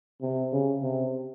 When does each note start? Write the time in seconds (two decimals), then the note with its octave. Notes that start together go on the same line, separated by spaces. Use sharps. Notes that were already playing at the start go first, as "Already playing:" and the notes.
0.22 C3
0.52 C#3
0.83 C3